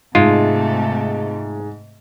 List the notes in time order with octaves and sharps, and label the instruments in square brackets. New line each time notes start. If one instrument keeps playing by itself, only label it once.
[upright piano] G#2 [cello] C3 A3 [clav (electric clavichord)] G#3 F4